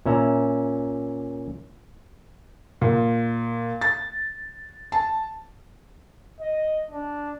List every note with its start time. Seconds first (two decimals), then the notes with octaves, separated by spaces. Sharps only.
0.06 A#2 C#4 E5 A#5
2.81 A#2
3.81 A6
4.92 A5
6.40 D#5
6.91 D4